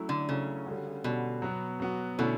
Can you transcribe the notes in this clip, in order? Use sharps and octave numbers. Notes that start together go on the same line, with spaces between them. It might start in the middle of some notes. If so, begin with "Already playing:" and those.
Already playing: F#3 A3 C#4 E4
D3
C#3 F#3 A3 C#4 E4
D3 G3 C#4 F#4
B2 D3 G3 C#4 F#4
F#3 B3 F#4
F#3 B3 F#4
B2 D3 A3 C#4 E4